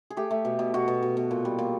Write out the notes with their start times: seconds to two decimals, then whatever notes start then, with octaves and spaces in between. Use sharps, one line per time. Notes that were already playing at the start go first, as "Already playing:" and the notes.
0.10 G#4
0.17 A3 G4
0.31 A3
0.45 B2
0.59 B2
0.74 B2 F#4
0.88 B2
1.02 B2
1.17 B2
1.31 A#2
1.45 G3
1.59 A#2